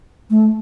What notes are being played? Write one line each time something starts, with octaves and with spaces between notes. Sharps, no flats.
A3